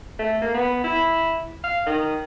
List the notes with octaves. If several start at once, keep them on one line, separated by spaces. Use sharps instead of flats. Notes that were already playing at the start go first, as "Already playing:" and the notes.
A3
A#3
B3
E4
F5
D#3